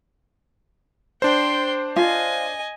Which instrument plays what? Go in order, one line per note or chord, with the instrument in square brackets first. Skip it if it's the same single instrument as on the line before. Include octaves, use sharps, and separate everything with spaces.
[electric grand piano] D4 C5 [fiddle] G5 C6
[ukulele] F4 [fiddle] D#5 G#5